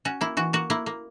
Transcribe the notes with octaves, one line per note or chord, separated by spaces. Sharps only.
C#4 F#4
A#3 E4
E3 F#4
A#3 F#4
A#3 E4
A#3